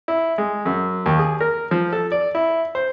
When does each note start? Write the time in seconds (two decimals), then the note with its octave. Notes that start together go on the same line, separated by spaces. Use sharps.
0.08 E4
0.38 G#3
0.65 F#2
1.06 D#2
1.19 G#4
1.41 A#4
1.71 F3
1.93 A4
2.12 D5
2.35 E4
2.75 C5